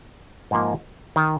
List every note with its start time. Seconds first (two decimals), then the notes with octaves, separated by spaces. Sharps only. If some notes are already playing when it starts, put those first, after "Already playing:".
0.51 G#2 F3 A#3
1.16 D#3